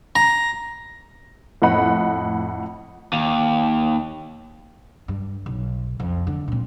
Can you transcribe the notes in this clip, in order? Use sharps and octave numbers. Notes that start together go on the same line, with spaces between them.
A#5
F2 A2 D#5 F#5 B5
D#2
G2
B1
F2
D3
A#2 C4